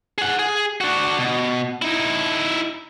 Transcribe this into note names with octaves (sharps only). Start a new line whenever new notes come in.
G#4 F#5
G#4
D4 F#4
B2
D#4 E4